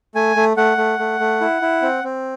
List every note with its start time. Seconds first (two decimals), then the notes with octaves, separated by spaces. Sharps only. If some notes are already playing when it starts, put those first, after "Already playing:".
0.15 A3 G#5
0.36 A3
0.57 A3 F#5
0.77 A3
0.99 A3
1.20 A3
1.41 E4
1.62 E4
1.82 C4
2.04 C4